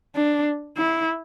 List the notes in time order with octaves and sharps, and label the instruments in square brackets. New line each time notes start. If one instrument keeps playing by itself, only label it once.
[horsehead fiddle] D4
E4